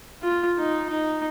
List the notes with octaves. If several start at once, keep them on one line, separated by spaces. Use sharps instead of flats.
F4
D#4
D#4